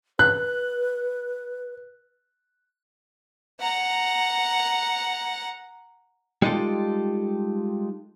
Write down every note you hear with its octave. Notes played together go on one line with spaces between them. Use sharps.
B4 F#6
F#5 A#5
G3 G#3 D#4 F4 G4 A4